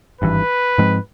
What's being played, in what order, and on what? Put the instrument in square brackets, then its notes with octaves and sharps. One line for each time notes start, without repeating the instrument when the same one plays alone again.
[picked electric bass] G#1 G2 E3 [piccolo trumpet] B4
[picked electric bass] G#2 F3 G#3 C4